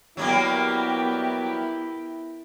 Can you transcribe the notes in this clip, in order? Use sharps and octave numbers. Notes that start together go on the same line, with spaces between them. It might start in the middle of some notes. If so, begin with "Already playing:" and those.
F#3 G3 A#3 B3 E4 G4 A#4